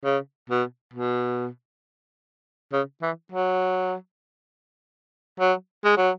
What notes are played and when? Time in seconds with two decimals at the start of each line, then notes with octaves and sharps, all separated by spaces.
0.05 C#3
0.50 B2
0.94 B2
2.73 C#3
3.02 E3
3.32 F#3
5.40 F#3
5.84 G#3
5.97 F#3